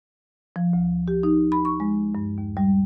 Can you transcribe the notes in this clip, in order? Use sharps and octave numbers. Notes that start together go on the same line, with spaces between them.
F3
D2
G4
D#4
B5
C#6
G#3
G2
D#2
G3